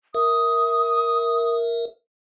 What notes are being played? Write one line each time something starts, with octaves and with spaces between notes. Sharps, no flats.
A#4 E5 D#6